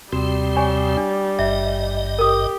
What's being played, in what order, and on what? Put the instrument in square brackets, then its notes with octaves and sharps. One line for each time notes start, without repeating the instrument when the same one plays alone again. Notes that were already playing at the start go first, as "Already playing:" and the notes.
[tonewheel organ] D#2 C3 C4 [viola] G3 [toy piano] F#4
[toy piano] C#5 G#5 C#6
D4
[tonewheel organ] G#1 G2 D#5 [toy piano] E5
[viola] G4 [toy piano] A#4 D#6